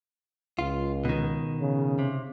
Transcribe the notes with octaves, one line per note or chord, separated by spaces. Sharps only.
C#2 F4
B2 D#3
C#3
C3